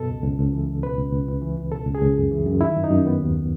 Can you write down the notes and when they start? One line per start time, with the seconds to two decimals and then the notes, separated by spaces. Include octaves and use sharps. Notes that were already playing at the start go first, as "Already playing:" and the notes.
Already playing: F#2 B2 A4
0.09 C#2
0.24 C#2
0.38 C#2
0.53 E3
0.69 C#2
0.83 B2 B4
0.98 C#2
1.13 C#2
1.27 C#2
1.42 E3
1.57 C#2
1.72 B2 A4
1.86 C#2
1.95 G#4
2.02 C#2
2.17 F#2
2.31 E3
2.46 F#2
2.61 D#3 E4
2.76 F#2
2.84 D#4
2.90 F#2
3.05 D#3 B3
3.21 D#2